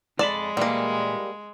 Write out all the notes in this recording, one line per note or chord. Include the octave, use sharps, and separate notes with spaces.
F2 G#3 D5 A5 B5
A#2 E3 G3 A#3